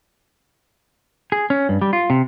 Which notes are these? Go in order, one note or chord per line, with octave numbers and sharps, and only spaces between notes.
G#4
C#4
G2
G3
F4
C3